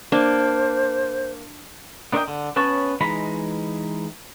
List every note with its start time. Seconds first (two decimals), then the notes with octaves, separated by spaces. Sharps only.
0.12 A#3 D4 C5
2.13 B3 D4 A#4 C#5 D#5 G5
2.28 D3
2.56 B3 C#4 B4 C#5 A5
3.01 E3 G#3 D#4 A#5 B5